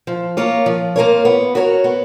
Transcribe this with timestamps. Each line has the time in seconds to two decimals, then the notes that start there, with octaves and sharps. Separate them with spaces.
0.07 F3
0.37 A#3 F4 A#4 C#5
0.66 F3
0.96 A#3 F4 A#4 C#5
1.25 B3
1.55 F#4 A#4 C#5
1.84 B3